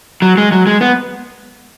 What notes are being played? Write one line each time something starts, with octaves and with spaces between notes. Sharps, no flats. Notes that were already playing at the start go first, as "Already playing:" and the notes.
F#3
G#3
F#3
G#3
B3